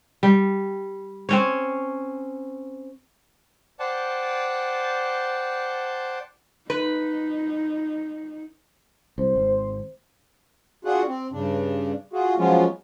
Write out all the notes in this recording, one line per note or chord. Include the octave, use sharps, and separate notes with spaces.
G3
C4 C#4 C#5
C5 D5 F#5 G5 A5
D#4 B4
C2 C5
G#1
D4 F4 F#4 G#4 F#5
C4
G2 C#3 D4
F4 F#4 G#4
F3 F#3 G#3 B3 C#4 F4